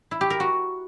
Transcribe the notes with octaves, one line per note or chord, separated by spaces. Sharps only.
E4
G4
A#4
F#4